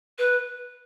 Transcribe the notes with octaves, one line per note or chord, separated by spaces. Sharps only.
B4